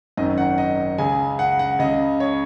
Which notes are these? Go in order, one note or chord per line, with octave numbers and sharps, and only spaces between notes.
G#1 F#2 D#3 D#5
F#5
D#5
C#2 C#3 G#5
F#5
F#5
C#2 C#3 D#5
C#5